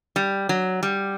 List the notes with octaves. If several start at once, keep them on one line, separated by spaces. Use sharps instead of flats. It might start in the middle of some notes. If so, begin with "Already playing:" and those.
G3
F#3
G3